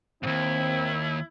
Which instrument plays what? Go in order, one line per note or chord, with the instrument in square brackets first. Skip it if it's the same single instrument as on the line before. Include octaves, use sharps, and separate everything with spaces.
[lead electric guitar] D#2 G#2 [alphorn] C4 [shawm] E4